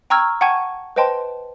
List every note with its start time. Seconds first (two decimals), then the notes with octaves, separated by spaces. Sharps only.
0.10 G5 A#5 C#6 E6 F6 G#6
0.41 F#5 G5 A5 C#6 G#6 D#7
0.96 B4 C5 D#5 G5 A5 C6